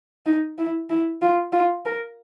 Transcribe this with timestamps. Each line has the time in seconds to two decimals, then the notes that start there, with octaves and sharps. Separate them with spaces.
0.26 D#4
0.58 E4
0.90 E4
1.22 F4
1.52 F4
1.85 A#4